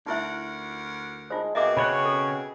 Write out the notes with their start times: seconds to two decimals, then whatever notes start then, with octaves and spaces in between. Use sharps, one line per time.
0.06 D2 D#4 E4 A#4 E5 F#5
1.30 G#3 D#4 F4 C5
1.55 B2 A#3 C4 G#4 D#5 E5 D6
1.77 C#3 C#4 C#5 F#5 B5
2.05 A4